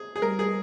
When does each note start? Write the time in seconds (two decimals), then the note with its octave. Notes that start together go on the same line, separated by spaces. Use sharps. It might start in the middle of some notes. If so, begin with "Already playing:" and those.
Already playing: G#4
0.16 G#4
0.22 G3 A#4
0.39 G#4